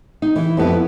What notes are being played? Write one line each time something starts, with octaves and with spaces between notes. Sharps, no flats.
D#4
E3
F2 B3 E4